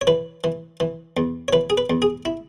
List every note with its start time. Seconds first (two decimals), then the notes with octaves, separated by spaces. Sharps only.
0.01 C#5
0.07 E3 B4
0.44 E3
0.80 E3
1.17 E2
1.48 C#5
1.53 E3 B4
1.70 G#4
1.78 B4
1.90 E2
2.02 G#4
2.25 E4